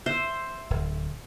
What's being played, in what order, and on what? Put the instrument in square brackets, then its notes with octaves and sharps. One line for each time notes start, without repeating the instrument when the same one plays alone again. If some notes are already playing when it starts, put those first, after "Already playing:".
[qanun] C5 [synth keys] E5 E6
[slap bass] D1